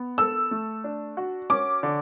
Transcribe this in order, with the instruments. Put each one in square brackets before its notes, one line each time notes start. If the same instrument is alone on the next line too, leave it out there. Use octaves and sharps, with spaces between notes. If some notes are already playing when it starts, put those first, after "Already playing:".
Already playing: [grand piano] B3
[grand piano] A4 [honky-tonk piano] E6
[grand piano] A3
D4
F#4
[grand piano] C#4 [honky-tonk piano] D6
[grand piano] D3